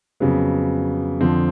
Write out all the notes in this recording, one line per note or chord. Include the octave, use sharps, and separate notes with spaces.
F2 C#3 F#3 B3
F2 D3 F3 C4